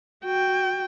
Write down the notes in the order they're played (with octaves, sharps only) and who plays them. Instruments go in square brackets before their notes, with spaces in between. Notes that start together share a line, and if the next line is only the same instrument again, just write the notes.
[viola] F#4 G5